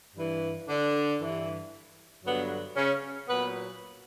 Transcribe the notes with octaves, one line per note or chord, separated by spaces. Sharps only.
G2 E3
D3 D4
G2 E3
G2 D3 F#3 B3
C#3 C#4
A#2 F#3 B3 B4